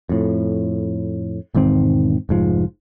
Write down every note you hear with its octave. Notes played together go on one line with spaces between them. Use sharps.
F2 A2
E1 G#2 D#3 C4
F1 G#2 F3